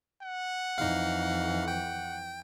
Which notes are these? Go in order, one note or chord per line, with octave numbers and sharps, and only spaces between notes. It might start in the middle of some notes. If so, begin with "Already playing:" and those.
F#5
F2 E3 D#4 F5
G5